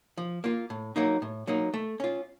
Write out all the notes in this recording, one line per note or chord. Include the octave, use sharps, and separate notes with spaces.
F3
A#3 F4
A2
F#3 A#3 D#4
A2
F#3 A#3 D#4
A3
C#4 F4